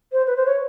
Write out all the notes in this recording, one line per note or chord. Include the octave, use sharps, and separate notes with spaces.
C5
B4
C5
C#5